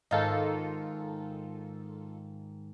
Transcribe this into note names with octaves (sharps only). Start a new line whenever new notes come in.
G#2 D#3 D#4 F4 A4